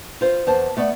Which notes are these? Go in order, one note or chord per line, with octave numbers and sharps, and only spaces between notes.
F4 C5
E2 C5 A5
A3 B3 D5